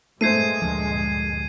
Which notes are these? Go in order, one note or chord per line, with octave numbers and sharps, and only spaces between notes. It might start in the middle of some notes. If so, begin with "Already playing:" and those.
G2 A#2 G#3 A3 C5 G#6 C7 D#7
D2 F3